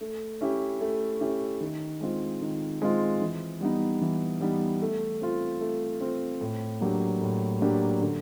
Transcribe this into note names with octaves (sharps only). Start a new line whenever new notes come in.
A3
C#4 E4 G4
A3
C#4 E4 G4
D#3
G#3 C4 F4
D#3
G#3 C4 F4
E3
G3 B3 D#4
E3
G3 B3 D#4
A3
C4 F4
A3
C4 F4
A2
F#3 A#3 D4 G4
A2
F#3 A#3 D4 G4
D3